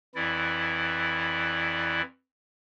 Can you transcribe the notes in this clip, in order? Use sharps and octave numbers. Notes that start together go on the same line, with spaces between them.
F2 E3 E4 D5